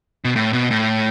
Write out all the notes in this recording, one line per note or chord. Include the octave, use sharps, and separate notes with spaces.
B2
A2
B2
A2